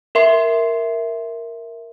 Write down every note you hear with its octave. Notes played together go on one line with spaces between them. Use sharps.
A#4 E5 C6 C7